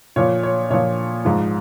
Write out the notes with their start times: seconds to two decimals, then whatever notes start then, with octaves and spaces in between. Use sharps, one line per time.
0.16 A#2 F3 C#5
0.43 C#5
0.70 A#2 F3 C#5
1.25 G#2 F3